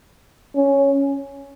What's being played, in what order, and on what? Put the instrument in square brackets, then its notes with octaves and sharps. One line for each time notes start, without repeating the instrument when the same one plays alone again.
[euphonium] C#4